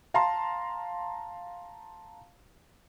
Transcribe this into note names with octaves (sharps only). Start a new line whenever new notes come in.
F5 A5 A#5 C6